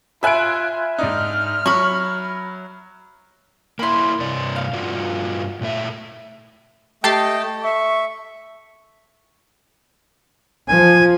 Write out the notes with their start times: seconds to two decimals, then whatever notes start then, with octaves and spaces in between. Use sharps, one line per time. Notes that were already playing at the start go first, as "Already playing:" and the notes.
0.23 F4 E5 G#5 B5 F#6 D7
0.99 G#2 D4 D#4 F6
1.66 F#3 B5 C#6
3.79 A#3 E4 B5 C6
4.20 G2 C3 D5
4.56 F5
4.73 G2 F4 F#4
5.61 A#2 A3 E5
7.04 A3 G4 A4 D#5 G5 A6 C7
7.64 E5 C#6
10.68 F3 G#5